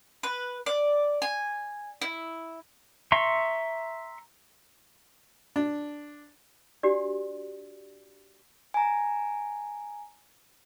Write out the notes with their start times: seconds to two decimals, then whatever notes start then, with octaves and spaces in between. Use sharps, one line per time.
0.23 B4
0.66 D5
1.22 G#5
2.01 E4
3.12 E5 A#5 C6 C#6
5.56 D4
6.83 D4 F#4 G4 D5
8.74 G#5 A#5